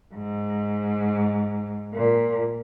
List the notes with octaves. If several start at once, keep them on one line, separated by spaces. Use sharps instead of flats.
G#2
A#2